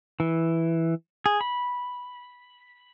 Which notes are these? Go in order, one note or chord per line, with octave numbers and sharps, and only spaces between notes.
E3
G#4
B5